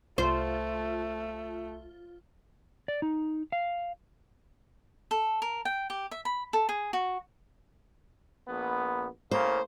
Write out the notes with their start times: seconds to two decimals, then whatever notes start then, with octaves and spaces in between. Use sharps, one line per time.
0.18 C2 A3 F4 C5
2.88 D5
3.02 D#4
3.52 F5
5.11 A4
5.42 A#4
5.65 G5
5.90 G4
6.11 E5
6.25 B5
6.53 A4
6.69 G#4
6.93 F#4
8.48 A#1 B3
9.31 A2 C#3 A#3 C5